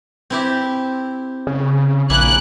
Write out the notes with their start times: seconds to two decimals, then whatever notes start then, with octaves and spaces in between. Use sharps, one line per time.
0.30 C4 E4 G4
1.47 C#3
2.10 A#1 A#3 E4 G#5 F#6